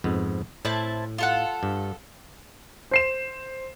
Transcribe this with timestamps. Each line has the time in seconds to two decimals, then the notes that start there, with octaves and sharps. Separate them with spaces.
0.04 F2 G#2 B3
0.65 A2 C4 E4 A5
1.18 F4 A4 F#5
1.63 G2
2.91 C5 C7 E7